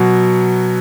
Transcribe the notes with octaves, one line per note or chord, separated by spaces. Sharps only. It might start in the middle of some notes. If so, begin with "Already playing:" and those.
Already playing: B2 F#3